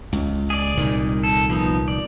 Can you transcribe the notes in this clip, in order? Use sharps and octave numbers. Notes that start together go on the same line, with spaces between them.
C#2
G#4 D5
C2 A#2 D#3
A4
F3 B3 D#4
D5